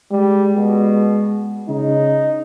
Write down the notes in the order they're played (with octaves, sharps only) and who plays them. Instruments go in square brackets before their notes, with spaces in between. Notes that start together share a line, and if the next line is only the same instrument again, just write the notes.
[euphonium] G3 [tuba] G#3
[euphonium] B2
[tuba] C#3 [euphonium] D#4